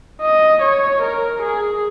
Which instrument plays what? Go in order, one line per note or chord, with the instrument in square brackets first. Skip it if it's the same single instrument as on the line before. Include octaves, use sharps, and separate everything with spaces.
[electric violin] D#5
C#5
A#4
G#4